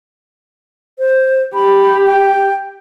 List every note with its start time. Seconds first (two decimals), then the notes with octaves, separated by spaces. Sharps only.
0.99 C5
1.54 G4 B5
2.08 G5